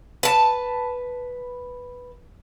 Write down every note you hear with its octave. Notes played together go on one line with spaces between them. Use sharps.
B4 A5